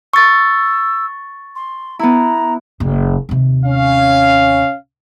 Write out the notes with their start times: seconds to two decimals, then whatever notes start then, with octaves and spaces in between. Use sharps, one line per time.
0.13 C#6 E6 A6
1.56 C6
1.99 B3 E4 A#5
2.80 F#1 C#3
3.29 D#2 C3
3.65 C#4 F5